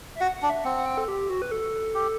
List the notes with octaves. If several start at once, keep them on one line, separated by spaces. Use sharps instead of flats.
E5
F#4 F#5
F#5
D4
E5
C4 F#5
F#5
G5
A4
G4
F#4
B4
A4
G4